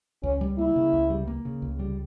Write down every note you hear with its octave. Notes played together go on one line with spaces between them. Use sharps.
C#2 C#4
G3
A#3 E4
C#3
C#2
G3
A#3
C#3
C#2
G3